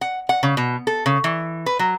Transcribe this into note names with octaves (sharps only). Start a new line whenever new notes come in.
F#5
F#5
C#3
B2
A4
C#3
E3
B4
F#3